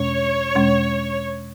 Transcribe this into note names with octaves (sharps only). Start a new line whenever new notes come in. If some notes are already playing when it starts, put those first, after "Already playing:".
Already playing: E2 B2 G#3 C#4 C#5
E2 B2 G#3 C#4